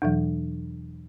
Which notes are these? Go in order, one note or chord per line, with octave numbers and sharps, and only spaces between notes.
E2 B2 E3 F#3